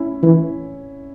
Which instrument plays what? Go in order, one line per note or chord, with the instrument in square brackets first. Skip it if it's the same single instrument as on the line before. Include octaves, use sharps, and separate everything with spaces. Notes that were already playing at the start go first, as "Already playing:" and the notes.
Already playing: [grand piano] C#4 E4
[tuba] E3 [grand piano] E4